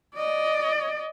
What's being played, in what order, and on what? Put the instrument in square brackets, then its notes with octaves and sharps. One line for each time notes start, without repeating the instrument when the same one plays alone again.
[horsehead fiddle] D5 D#5